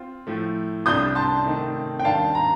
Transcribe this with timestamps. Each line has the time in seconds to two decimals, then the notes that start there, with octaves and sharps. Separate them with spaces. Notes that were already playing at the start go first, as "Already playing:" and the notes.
Already playing: C4 F4
0.27 A2 F3 A3
0.86 C2 C3 G3 D4 F4 D#6 G6
1.15 A5 C6
1.45 C3 D#3 A3 C4 D#4
1.99 G5
2.05 D#2 D#3 G3 D4 F5 A5
2.35 A#5